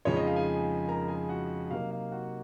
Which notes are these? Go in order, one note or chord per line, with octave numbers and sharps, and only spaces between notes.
F2 C#3 F3 G#3 D#4 C#5 C#6
D#5
F5
G#4 G#5
A#4 A#5
G#4 G#5
F#4 F#5
C3 F#3 A#3 D#4 F5
F5
F#4 F#5